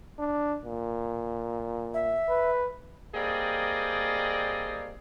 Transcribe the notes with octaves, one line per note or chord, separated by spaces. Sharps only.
D4
A#2
E5
B4
G3 A#3 C4 G#4 D5 D#5